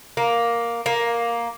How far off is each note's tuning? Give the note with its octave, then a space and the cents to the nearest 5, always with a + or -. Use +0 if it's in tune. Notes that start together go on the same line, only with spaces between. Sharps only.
A#3 +5
A#3 +5